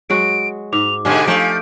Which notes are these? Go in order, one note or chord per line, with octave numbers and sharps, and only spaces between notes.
F#3 G#3 F#4 D7
G#2 D6 F7
G#2 B2 D3 D4 G4 G#4 G#5
F3 A3 D#4 E5 G#5 G6 D7